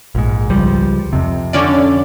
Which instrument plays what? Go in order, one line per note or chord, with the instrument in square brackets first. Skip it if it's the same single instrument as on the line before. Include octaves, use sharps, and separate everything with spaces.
[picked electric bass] A#1 G#2
C#2 F3 G3
F2 C3
[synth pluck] D3 C#4 D5